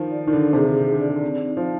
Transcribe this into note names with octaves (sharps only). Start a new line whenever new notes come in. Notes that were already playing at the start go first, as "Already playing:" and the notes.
Already playing: D#3 F3 D#4
D5
D#3
D3 D#4
C3 G#4
D3
D#4
D3
D5
C4
D#4
F3